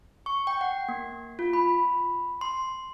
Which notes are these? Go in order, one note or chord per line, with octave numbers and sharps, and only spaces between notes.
C#6
G5
F#5
A#3
F4
B5
C6